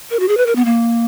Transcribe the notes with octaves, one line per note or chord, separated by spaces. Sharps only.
A#4
F#4
G#4
B4
A#4
B3
A#3